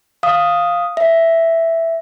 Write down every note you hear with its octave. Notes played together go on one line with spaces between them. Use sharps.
F5 D#6
E5